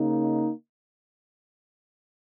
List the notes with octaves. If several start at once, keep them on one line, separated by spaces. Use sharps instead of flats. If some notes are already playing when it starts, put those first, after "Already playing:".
Already playing: C#3 A#3 D#4